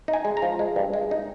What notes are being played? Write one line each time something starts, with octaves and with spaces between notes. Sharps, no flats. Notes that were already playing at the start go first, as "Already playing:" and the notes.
D#4
G#5
G#3
A#5
F3
G#3
G2
G#3
D#4